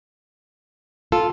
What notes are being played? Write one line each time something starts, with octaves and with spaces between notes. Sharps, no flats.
F4 A4